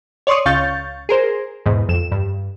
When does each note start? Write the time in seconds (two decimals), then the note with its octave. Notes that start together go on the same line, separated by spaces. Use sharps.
0.27 C#5 D5 C6 C#6 D#6
0.45 C#2 C#3 F5 C#6 G6 A6
1.09 G#4 A#4 C5
1.66 E2 G#2 B2
1.89 F2 E7
2.12 G2